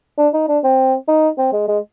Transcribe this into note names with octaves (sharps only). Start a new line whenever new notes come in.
D4
D#4
D4
C4
D#4
C4
G#3
G#3